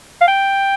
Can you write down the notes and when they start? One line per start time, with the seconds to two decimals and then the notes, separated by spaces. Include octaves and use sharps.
0.21 F5
0.28 G5